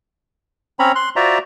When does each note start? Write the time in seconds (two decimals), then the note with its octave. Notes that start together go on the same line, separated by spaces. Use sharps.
0.79 C4 C#4 C#5 A#5 B5
0.95 C6 F#6
1.16 F4 F#4 C5 D5 E5 A#5